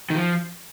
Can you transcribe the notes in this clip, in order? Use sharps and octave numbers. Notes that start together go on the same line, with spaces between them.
D#3
F3